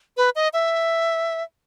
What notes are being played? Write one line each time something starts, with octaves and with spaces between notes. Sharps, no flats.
B4
D#5
E5